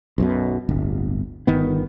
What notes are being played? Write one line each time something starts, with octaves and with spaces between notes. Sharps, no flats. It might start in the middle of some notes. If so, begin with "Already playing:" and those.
B1 F#2 B2
D1 G1
G1 D#3 B3